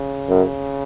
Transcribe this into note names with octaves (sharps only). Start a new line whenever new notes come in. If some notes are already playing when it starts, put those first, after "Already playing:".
Already playing: C#3
F#2